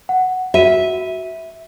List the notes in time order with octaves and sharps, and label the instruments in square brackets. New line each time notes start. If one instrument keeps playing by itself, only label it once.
[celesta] F#5
[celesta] F#4 D#7 [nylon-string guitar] E5